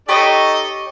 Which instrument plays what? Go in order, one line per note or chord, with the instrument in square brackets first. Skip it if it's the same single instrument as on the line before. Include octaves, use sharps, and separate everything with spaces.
[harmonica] D#4 A4 D#5 [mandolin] G4 C#5 B5